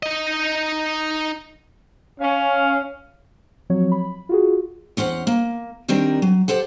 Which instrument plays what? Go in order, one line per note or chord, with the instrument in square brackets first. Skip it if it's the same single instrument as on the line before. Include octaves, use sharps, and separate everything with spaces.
[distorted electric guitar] D#4 D#5
[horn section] C#4 F5
[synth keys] F3 F#3 C4 C#5
B5
F4 F#4 G#4
[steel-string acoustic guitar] E2 C#4 C5 F#5
A#3
D#3 G3 C4 D4 A#4
F#3
G4 A4 C5 F#5